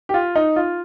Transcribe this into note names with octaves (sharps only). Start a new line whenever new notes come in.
G4
F4
D#4
F4